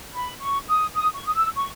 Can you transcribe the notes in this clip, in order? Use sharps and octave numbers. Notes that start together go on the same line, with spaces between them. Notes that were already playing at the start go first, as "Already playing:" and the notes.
B5
C#6
D#6
D#6
C#6
D#6
E6
C#6